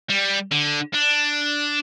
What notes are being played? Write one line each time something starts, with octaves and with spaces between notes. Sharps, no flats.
G3
D3
D4